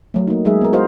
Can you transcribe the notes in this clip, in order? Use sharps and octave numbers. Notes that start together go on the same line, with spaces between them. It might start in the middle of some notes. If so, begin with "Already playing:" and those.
F#3 A3
A#3 D#4
F#3 G#3 D#4 G#4 E5
B3 A#4
E4 F#4 A#4 C5 D#5 F5